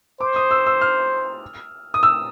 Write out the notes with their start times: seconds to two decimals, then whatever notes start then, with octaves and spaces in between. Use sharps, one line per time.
0.20 C5 D6
0.36 D#6
0.51 E6
0.67 E6
0.81 F6
1.94 D#6
2.03 E6